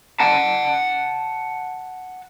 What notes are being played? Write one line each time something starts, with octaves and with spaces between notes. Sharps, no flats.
F#5 A5